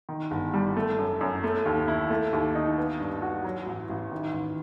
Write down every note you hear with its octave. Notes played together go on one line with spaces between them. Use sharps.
D#3
G1
G3
A3
F#2
F#2
A3
D#2
E4
A3
D#2
D#4
B3
G2
F#4
F#3
A1
A1
D#3
A1